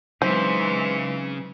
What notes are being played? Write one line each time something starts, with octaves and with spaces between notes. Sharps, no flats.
C#3 E3 F#3 G#3 C4 D#4 C5